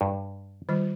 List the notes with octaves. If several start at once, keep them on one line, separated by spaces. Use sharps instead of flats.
G2
D#3 G3 F4